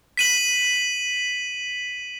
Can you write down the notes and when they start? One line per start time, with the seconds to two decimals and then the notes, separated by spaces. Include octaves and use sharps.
0.17 B6 D#7 F#7